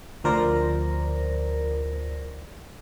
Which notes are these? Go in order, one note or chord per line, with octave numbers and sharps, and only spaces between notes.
D2 F3 A#4 C5 D5 A#6